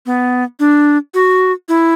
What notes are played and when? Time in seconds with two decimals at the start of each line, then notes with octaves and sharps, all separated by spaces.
0.06 B3
0.60 D4
1.14 F#4
1.69 E4